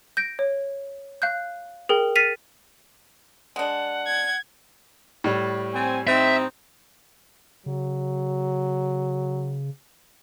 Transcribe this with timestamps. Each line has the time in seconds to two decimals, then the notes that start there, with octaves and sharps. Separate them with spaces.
0.17 G6 A#6 D7
0.39 C#5
1.22 F5 F#6 G6
1.89 G#4 A#4 G5
2.16 F6 A6 B6 C7 D#7 F7
3.56 G#3 D4 F#5
4.07 G#6
5.24 A2 G3
5.74 C4 G#5
6.07 C4 D#4 E5
7.66 C#3 F#3